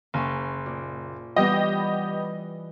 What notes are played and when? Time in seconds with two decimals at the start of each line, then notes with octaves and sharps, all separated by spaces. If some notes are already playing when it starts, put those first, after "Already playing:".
0.14 F#1 F5 G#5 C#6
0.66 A#2
1.36 E3 G3 B3 G4 D#5 D#6